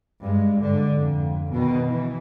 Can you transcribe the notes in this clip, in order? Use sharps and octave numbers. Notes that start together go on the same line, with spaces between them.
G2 G#3
G#2 D3
F2
B2 D#3
E3